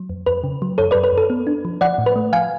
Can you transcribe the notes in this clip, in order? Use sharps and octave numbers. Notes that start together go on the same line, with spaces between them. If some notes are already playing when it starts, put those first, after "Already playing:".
Already playing: F#3
F2
F2 B4
C#3
F#3
F#2 A4 C#5
F#2 B4 D5
B4
F#2
A4
B3
D4
F3
F3 D5 F#5
A2
B4
A3
F3 F5 G#5